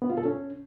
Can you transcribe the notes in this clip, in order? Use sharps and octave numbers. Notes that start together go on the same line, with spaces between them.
B3
F4
A4
C#4